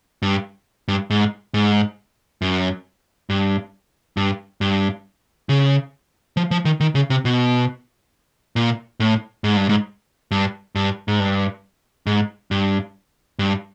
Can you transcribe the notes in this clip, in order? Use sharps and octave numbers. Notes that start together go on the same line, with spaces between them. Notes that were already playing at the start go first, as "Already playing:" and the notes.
G2
G2
G#2
G#2
F#2
G2
G2
G2
C#3
F3
F3
D#3
D#3
C#3
C3
B2
A#2
A2
G#2
G2
G#2
G2
G2
G#2
G2
G#2
G2
G2